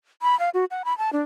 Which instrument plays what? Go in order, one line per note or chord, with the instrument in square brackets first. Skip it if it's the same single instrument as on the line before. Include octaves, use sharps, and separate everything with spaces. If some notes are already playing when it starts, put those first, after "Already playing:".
[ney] B5
F5
F#4
F#5
B5
A5
D4